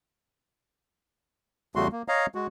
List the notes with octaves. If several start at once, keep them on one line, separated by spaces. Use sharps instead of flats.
E2 C#3 G3 A3 F#4 C6
A#3
C#5 D#5 F5 A#5
G#3 F#4